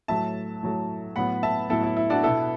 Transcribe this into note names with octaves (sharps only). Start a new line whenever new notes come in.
A2 F#3 A3 E5 A5
A2 F#3 A3
A2 F#3 B3 F#5 B5
E5 A5
A2 F#3 B3 E4 A4
E4
E4
D4 F#4
B2 B3 E4 A4